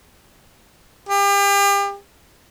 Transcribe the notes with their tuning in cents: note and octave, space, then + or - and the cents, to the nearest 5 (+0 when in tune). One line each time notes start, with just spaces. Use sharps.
G4 +35